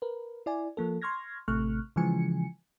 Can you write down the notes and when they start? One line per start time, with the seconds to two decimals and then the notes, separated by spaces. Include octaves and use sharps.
0.02 A#4 B4
0.46 E4 D5 G#5
0.77 F3 A#3 A4
1.02 C6 C#6 F6 G#6 A#6
1.48 A1 C3 A3 C#6 F6 F#6
1.96 C#3 E3 F3 G#3 G#5 C#7